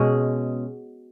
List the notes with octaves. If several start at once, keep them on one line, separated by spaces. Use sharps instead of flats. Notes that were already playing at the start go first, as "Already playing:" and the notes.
Already playing: B2 G#3 C#4